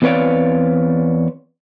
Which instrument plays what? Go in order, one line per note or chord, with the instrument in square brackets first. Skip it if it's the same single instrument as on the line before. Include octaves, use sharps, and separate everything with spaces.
[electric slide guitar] E2 C4 B4 C#5 D5 F5